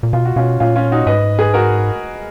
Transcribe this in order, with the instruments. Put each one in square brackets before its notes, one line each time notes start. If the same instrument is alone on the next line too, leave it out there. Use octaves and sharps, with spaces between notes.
[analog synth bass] A#2
[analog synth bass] B2 [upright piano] F4
[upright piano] F#4
[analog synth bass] B2 [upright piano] C#4 F4
[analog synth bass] A#2 [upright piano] C#4 F4
[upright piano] C#4 F4
D#4 F#4
[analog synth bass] G#2 [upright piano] B4 D#5
[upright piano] G#4 B4
F#4 A#4